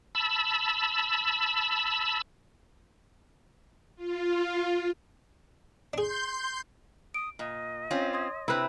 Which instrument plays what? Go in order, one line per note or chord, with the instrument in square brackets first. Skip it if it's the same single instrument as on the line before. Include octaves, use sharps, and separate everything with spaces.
[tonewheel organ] A5 B5 E6
[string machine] F4
[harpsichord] D4 G#4 [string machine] C6 G6
[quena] D#6 [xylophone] D7
[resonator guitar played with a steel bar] A#2 [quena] D#5
[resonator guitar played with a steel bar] C4 C#4 F4 [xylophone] C#5 G6
[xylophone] C6 D#6 G#6
[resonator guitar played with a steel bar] C3 C4 [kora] E4 B4